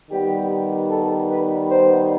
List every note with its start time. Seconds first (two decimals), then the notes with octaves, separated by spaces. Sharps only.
0.11 D#3 G3 B3 G4
0.91 A4
1.30 B4
1.70 C5